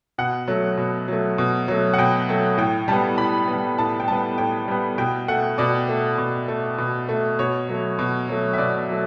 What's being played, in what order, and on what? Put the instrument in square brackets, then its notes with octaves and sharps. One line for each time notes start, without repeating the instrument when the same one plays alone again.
[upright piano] B2 F#5
F#3 A3
B2
F#3 A3
B2
F#3 A3
F#5
B2 G5
F#3 A3
A2 G5
G3 B3 A5
A2 B5
B3
G3
A2 A5
G5
G3 B3 A5
A2 G5
G3 B3
B2 G5
A3 F#5
B2 D5
A3
B2
A3
B2
A3
B2 C#5
F#3 A3
B2
F#3 A3
E5
B2 D5
F#3 A3